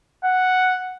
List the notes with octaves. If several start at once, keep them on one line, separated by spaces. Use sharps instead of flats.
F#5